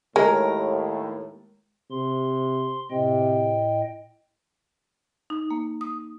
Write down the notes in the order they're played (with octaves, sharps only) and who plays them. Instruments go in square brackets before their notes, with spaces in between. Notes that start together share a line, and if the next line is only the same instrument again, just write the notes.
[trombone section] D#2 A2 [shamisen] G#3 [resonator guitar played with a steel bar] A#4
[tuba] C3 [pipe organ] C6
[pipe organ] A2 D#5 G5 [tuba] C3
[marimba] D#4
A#3
D#6